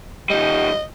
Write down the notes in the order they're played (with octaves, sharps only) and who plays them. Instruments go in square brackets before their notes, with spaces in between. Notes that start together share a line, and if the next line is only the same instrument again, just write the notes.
[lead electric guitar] D#3 G3 [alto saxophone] D#5